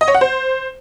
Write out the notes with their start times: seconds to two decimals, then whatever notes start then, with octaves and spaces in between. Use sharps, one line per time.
0.01 D#5
0.08 C#5
0.14 F#5
0.21 C5